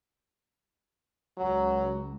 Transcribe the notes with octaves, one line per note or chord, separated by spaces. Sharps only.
C#2 F#3